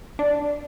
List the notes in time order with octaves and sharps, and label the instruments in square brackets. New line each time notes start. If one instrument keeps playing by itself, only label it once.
[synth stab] D4